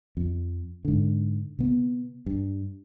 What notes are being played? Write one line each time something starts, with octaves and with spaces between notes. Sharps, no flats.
F2
G#2 D3
C3 B3
G2